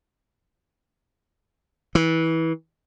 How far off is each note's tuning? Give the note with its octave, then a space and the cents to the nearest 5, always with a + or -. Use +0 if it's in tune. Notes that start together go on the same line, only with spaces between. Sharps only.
E3 -20